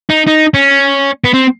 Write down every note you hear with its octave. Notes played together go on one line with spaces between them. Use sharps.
D#4
D#4
C#4
B3
C4